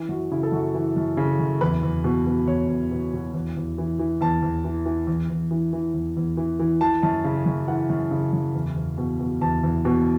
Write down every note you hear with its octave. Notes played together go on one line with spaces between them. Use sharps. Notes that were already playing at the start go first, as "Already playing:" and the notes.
Already playing: E3
F#2 F#4
C#3 E4
A4
F#2 F#4
E3
F#2
C#3
F#2
E2 B4
E2
B2
B2
E2 C#5
E2
B2
B2
E2
E2
E3
E3
E2 A5
E2
E3
E3
E2
E2
E3
E3
E2
E2
E3
E3
E3 A5
F#2 A5
C#3
F#2
E3 F#5
F#2
C#3
F#2
E2
E2
B2
B2
E2 A5
E2
B2